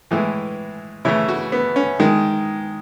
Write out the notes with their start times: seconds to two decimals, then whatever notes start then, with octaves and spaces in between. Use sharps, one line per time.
0.11 A2 E3 G#3
1.05 C#3 E3 A3 E4
1.28 F#4
1.52 B3
1.76 C#4
2.00 D#3 G#3